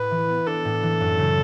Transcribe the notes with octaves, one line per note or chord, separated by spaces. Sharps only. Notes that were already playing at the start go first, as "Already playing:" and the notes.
Already playing: A2 B4
E3
B3
D4 A4
A2
E3
F#2
C#3